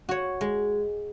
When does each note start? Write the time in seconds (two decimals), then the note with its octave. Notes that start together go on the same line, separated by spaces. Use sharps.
0.09 F#4 C#5
0.41 G#3